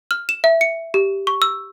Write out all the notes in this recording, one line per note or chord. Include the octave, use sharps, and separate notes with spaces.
F6
E7
E5
C#7
G4
C#6
E6